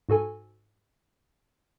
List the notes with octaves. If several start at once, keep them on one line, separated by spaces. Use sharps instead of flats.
G#2 F#4 A4 G#5